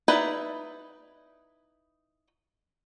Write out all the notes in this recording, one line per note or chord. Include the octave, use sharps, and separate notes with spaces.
D#4 E4 B4 D5